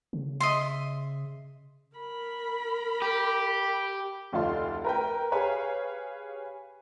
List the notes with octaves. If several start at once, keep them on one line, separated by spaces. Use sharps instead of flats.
C#3
D#5 E5 C6
A#4 B5
G4
F1 D2 D#4 F4 A4 C6
A#4 B4 G5
G4 G#4 B4 C#5 F5